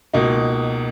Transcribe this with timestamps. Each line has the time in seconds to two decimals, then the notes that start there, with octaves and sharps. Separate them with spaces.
0.14 C#2 B2 A#3 D#4